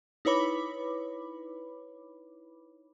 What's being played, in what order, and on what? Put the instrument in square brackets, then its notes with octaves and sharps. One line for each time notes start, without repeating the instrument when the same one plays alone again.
[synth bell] D#4 E4 B4 C#5 B5 D6